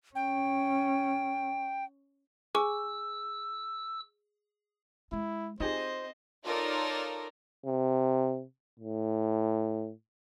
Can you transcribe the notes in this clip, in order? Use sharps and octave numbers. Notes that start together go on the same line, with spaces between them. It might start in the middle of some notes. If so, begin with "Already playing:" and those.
C#4 G5
G#4 G#5 C#6 E6
G#3 E4
C4 D#4 F4 G4 G#4 C5 D#5
D#4 F4 A4 A#4 C#5 D5
C3
A2